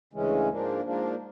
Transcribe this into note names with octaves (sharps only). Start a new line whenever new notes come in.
D2 C#3 E3 G#3 C#4
G#2 F3 A#3 D4
G#2 F3 A#3 D4